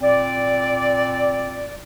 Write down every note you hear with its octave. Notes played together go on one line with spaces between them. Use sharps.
A#2 C4 D5